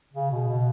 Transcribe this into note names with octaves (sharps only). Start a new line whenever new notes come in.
C#3
B2
B2